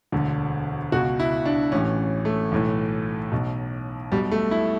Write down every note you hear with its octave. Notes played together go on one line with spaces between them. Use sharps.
E1 D2 D3
C#2 B2 F#4
E4
D4
A1 A2 E3 C#4
A3
B1 A2 E3
B1 B2
B1 B2 G3
A3
E4